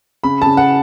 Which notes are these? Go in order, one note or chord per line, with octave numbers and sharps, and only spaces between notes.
C#3 B5
C#3 A5
F#5